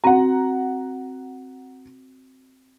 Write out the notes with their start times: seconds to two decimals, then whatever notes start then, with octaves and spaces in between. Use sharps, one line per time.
0.04 C4 F#4 F#5 A#5